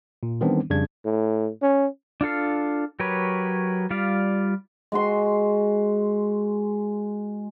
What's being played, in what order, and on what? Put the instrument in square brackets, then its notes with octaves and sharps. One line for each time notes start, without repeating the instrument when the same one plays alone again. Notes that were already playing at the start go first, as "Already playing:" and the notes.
[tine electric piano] A#2
D#3 E3 G3 B3 C4 D4
F2 C#3 G3 D4 G#6
[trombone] A2
C#4
[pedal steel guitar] D4 F4 A4 F5
F#3 G4 A#4 B4 C#5
G3 F4 D5 F5
[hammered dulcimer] G#3 F#4 C6